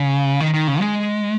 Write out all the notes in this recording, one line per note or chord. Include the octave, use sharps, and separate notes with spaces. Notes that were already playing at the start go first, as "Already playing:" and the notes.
Already playing: C#3
D#3
D#3
C#3
G#3